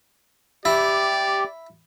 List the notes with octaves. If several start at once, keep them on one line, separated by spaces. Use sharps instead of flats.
E4 G4 D5